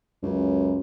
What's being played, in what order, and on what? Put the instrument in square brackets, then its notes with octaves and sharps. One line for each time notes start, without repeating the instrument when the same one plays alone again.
[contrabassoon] C#2 [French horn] F#2